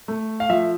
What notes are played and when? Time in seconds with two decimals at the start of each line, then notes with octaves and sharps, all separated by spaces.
0.08 A3
0.40 F5
0.50 F3 E5